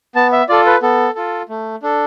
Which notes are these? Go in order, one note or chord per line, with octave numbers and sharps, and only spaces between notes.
B3 A5
E5
F4 A4 D5
B4
B3 A4
F4 A4
A3
D4 A4